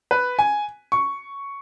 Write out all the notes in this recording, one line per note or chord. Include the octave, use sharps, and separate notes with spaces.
B4
G#5
C#6